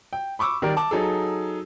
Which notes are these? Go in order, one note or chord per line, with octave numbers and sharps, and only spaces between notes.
G5
B5 C#6 D6 E6
D#3 G3 A#4 D5
A5 D6
F#3 D#4 G#4 A4